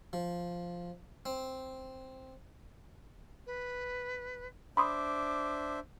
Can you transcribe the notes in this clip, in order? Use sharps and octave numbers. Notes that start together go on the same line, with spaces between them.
F3
C4
B4
D4 C5 E5 B5 C6 D6 D#6